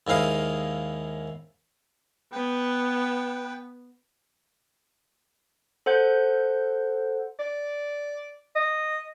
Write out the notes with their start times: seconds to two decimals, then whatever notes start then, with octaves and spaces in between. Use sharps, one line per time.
0.07 D#2 G#2 E4 F5 D#6
2.32 B3 B4 G5
5.86 A4 C5 F#5 G6
7.39 D5
8.55 D#5